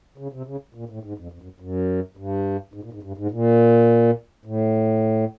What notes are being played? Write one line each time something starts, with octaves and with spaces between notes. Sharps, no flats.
C#3
C3
C#3
A#2
A2
G#2
F2
F2
F#2
F#2
G2
G#2
A#2
G#2
G2
G#2
A#2
A2